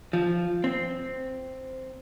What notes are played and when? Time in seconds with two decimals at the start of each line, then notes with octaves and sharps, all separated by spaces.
0.13 F3
0.64 C4